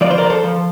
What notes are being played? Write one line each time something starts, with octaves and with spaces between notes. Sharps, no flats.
F3 D5
C5
A#4 D5
A4 C5
F3